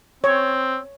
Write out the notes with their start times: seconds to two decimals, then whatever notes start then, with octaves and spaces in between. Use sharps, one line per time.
0.24 C4 C#5